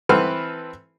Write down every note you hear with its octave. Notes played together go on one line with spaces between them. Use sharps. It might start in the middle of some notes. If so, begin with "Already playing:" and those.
E3 C4 A4 B4 F6